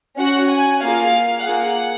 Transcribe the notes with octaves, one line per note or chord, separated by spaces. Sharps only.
C#4 F#4 F#5
G#5
A#3 F4 G#4 F5
A#3 F4 G#4 F#5